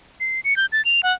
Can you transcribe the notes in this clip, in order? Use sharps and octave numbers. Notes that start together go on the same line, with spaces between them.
C7
C#7
G6
A6
F7
F#5